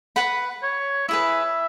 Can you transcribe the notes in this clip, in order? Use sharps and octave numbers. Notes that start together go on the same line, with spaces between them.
B4 F#5 B5
C#5
E4 G#4 B4 E5